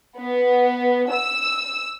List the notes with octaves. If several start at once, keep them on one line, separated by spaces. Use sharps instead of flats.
B3
E6